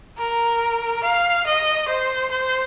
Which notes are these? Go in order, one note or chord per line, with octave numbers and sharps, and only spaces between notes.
A#4
F5
D#5
C5
C5